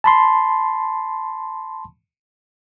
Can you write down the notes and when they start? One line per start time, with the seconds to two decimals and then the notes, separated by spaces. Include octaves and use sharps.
0.04 A5 B5 C6